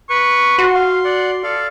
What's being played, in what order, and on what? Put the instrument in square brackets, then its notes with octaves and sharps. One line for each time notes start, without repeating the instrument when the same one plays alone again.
[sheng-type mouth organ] B4 [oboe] C#6
[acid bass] F#4 [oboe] C6
[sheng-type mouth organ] F5
D5 F#5
A4 D5 F5